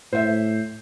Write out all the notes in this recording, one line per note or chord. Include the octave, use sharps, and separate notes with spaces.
A2 C5 E5